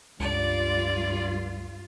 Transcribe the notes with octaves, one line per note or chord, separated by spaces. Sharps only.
C#2 G2 F4 D5